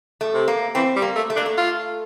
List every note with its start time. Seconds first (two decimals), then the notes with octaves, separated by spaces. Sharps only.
0.21 A3
0.34 C3
0.48 A#3
0.75 E3 C4
0.96 G3
1.02 A#3
1.16 A3
1.30 A3
1.36 A#3 D4
1.46 A3
1.58 F4